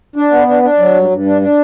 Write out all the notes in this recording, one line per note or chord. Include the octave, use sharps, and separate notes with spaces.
D4
B3
D4
D4
F#3
G2
G2
D4
D4